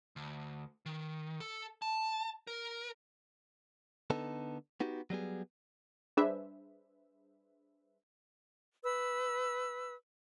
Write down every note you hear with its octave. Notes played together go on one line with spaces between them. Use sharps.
D2
D#3
A4
A5
A#4
D3 B3 D#4 A4
B3 D#4 F#4 G4
F#3 G3 B3 G#4
G3 D4 G#4 B4 C5 E5
B4 E6